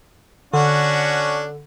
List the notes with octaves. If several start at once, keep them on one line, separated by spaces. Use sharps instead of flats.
D3 C#4 D4 F#4